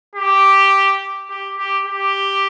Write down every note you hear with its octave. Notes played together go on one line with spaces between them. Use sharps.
G4
G4
G4
G4